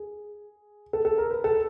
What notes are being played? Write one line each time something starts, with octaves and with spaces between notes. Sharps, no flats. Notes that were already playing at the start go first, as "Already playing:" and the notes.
Already playing: G#4
A4
A4
A#4
B4
A4